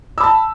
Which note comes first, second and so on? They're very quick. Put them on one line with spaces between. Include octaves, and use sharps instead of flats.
E6 B5 A5